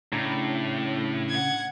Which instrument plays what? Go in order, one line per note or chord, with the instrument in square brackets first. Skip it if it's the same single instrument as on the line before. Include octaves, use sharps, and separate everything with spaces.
[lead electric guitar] A2 [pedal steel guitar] C#3 D4 A#5
[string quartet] F#5 G#6